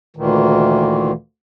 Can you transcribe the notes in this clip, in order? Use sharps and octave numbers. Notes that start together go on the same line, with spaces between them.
D2 A#2 D#3 E3